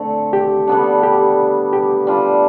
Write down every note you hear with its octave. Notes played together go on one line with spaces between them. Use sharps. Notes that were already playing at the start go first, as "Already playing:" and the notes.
Already playing: D3 A3 C4
G4
D3 G3 B3 D4
G4
G4
G3 D4 F4